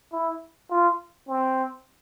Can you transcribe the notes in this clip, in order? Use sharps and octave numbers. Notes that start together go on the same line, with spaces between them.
E4
F4
C4